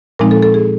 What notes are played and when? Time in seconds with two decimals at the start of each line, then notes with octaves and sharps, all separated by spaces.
0.19 A#2 F3 G#3 C4 D#4 A#4
0.31 A4
0.43 A4
0.54 G#4